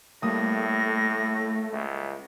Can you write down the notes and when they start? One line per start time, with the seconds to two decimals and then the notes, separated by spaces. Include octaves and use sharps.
0.23 A2 G3 A3 A#3 D#6 A#6
1.73 C#2 E5